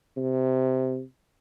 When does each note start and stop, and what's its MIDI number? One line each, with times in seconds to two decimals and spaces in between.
0.17 1.01 48